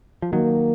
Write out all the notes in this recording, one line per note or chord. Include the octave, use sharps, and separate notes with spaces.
F3
D#3 F#3 A#3